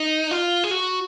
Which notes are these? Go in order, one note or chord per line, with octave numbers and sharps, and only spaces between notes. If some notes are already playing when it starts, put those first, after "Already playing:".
Already playing: D#4
F4
G#4
F#4